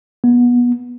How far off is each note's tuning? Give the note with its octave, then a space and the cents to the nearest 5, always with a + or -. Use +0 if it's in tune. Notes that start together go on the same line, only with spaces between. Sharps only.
B3 -25